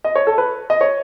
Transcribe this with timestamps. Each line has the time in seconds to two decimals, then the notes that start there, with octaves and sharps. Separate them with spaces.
0.04 D#5
0.15 C#5
0.27 A4
0.38 B4
0.70 D#5
0.81 C#5